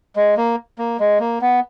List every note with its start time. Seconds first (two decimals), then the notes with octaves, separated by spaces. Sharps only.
0.16 G#3
0.37 A#3
0.78 A#3
1.00 G#3
1.20 A#3
1.41 B3